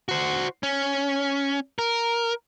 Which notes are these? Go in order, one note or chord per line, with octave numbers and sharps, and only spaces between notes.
F#4 C5
C#4
A#4